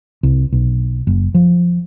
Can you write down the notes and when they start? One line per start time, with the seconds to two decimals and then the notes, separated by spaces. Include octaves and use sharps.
0.23 C2
0.52 B1
1.07 F#1
1.34 F3